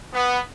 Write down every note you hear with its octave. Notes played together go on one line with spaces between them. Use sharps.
B3